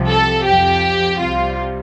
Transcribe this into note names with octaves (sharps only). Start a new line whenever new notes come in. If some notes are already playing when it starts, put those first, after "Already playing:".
Already playing: C2 C3 F3
A4
F2 F3 G4
C2 C3 G3 F4